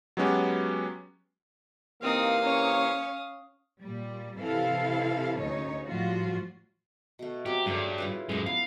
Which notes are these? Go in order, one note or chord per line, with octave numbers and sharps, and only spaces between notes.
F#3 G#3 B3 C#4 F#4 G4
C3 E3 A#3 C4 D#4 F5 D#6
C#4 C#5
A#2 G3
C3 E3 E4 A4 F5
D2 C#3 D#4 C#5
A2 F3 G3 F4 F#4
B2 A3
F#3 C4 G4
G2 C#3 G3 C#4 A4
E4 F4 B4
F#2 G#3 A#4 F5
B3 E4 F5